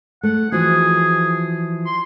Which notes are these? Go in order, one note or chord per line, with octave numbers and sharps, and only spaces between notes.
A3 F#5
E3 F3 F#4 G#4
C6